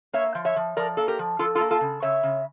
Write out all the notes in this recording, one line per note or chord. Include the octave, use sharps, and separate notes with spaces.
A#3 C#5 E5
F3
C#5 E5
F3
F3 A#4 D5
A#3 A4
G4 A#4
F3
F3 F4 A4
F4 A4
A#3
F4 A4
C#3
C#3 C#5 E5
C#3